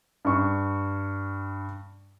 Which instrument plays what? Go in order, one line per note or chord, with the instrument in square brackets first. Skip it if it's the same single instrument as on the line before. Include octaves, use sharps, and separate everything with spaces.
[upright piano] G2 C#6